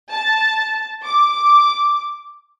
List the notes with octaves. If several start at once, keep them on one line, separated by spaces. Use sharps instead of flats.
A5
D6